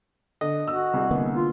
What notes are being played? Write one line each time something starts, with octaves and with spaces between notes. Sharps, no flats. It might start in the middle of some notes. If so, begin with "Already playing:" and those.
D3 D#5
F#4 E6
C2 G#4
D3 A#3 B3
F4